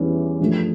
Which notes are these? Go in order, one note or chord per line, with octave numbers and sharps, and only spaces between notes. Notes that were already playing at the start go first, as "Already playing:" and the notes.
Already playing: E2 E3 G3 C#4 E4
G2 F3 A3